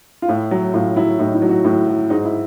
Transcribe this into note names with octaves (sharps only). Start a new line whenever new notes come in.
F4
A2 E4
F#3
A2 F4
F#3 E4
A2 D#4
E4
F#3
F#4
A2 E4
F#3
G#2 D#4
E4